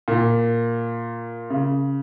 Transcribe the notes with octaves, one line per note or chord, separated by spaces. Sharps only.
A#2
C#3